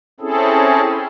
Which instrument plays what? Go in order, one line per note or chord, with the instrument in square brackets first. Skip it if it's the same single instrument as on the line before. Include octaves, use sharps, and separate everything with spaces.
[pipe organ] C4 C#4 E4 G#4 A4